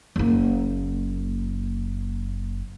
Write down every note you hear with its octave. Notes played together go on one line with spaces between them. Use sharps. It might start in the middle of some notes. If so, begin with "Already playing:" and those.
F#1 A#3